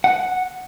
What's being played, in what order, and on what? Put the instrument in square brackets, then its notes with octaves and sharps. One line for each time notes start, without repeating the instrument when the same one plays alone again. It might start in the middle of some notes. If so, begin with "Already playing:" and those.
[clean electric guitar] F#5